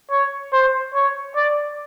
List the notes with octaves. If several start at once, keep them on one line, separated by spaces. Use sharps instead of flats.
C#5
C5
C#5
D5